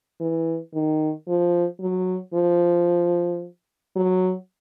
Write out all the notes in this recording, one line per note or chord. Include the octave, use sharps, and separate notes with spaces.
E3
D#3
F3
F#3
F3
F#3